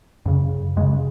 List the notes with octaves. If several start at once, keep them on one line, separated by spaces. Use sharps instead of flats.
F#2 C#3
F#2 C#3 G#3